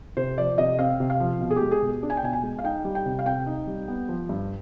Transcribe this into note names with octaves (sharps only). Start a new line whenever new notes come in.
C3 C5
F3 D5
C3 D#5
C4 F5
C3
F5
F3
B2
G#4
G4
G#3
G#4
B2
D4
G#5
G5
B2 G#5
G#5
G#3
F5
D#4 G5
G3
G5
C3
F5
C4 G5
D#4
G3
B3
F3
G2